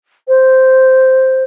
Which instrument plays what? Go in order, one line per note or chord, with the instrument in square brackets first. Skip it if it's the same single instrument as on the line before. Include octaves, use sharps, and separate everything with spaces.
[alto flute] C5